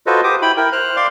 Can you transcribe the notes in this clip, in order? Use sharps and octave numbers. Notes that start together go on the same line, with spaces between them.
F4 F#4 A4 B4 C5 D#5
G4 C5 D6 D#6
E4 G5 B5
E4 A#4 G5
C5 F6 F#6
D5 F5 C6 D6